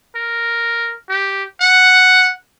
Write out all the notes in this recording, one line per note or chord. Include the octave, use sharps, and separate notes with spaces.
A#4
G4
F#5